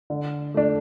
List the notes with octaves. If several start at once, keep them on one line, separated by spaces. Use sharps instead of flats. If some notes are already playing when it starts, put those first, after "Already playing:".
D3
A3 D4